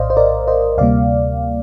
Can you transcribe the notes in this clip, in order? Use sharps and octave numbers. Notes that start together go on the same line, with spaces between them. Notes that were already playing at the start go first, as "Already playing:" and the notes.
Already playing: A#1 A2 C5 D5 D#5 F5
C5
A#4 D5
C5 D#5
D2 C3 G3 A#3 D5 F5